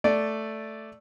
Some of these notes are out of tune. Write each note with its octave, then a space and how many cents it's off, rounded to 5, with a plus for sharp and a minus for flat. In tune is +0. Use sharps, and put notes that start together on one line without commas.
A3 +0 D5 -5